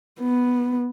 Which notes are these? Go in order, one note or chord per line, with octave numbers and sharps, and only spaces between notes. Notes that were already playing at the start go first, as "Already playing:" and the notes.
B3